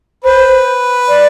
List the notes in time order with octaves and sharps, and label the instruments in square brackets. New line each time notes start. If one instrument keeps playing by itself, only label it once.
[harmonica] B4 [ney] C5
[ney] D5